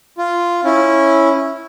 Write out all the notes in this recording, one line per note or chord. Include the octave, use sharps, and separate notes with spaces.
F4
C#4 E4